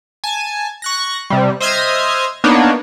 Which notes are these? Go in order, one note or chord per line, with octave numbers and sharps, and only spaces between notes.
G#5 A5
C#6 F#6 A#6
C3 G3
C5 D#5 E5 D#6 F6 G#6
A#3 B3 D4 D#4 C#5